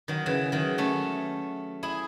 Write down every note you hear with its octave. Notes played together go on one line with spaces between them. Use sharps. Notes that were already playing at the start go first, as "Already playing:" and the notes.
D#3 F#3
C#3 E3
D#3 F#3
A3 C#4
E4 G#4